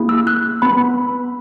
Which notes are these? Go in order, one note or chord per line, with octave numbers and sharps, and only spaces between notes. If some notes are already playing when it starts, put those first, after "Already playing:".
Already playing: A#3 E4 G#4
E6
F#6
B3 B5